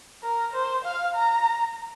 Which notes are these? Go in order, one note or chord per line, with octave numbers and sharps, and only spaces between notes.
A#4
C5
F5
A#5